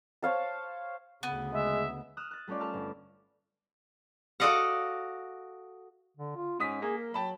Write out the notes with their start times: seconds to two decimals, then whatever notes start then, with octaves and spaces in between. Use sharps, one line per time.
0.22 C5 C#5 F5 A5
1.23 D2 C#3 B3
1.53 G#3 E5
2.17 D#6 F6 F#6 E7
2.31 F#6 A6
2.48 G3 A3 C#4 F4 D5
2.60 A4 A5 E6 F6
2.74 G1
4.40 F#4 A4 D5 D#5 F5 F#5
6.17 D3
6.36 F4
6.60 G#2 C#4 D#6 B6
6.82 A#3 G#4
6.97 A#4
7.14 F#3 G5 A5 B5